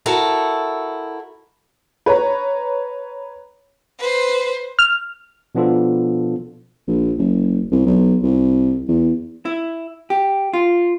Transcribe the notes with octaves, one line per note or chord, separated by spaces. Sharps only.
E4 F#4 A4 A#4
B4 C#5 A#5
B4 C5
F6
B2 F3 B3 D4 F4 A4
A#1
F#1
C2
B1
C2
E2
E4
G4
F4